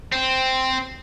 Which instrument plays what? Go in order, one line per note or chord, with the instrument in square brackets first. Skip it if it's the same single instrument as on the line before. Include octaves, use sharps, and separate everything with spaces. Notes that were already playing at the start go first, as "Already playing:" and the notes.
[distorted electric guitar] C4